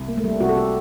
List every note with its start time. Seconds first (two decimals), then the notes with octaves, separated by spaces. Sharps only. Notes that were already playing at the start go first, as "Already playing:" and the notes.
Already playing: C2
0.08 A#3
0.17 A3
0.24 G3
0.40 C2 F#4
0.49 A4
0.57 G4